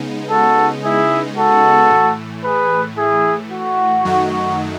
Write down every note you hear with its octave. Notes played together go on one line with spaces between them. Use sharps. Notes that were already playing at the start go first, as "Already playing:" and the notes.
Already playing: C#3 G#3 B3 D#4
F#4 A4
E4 G#4
F#4 A4
A2 E3 A3
G#4 B4
E4 G#4
F#4
F#2 D#3 F#3 A3 D#4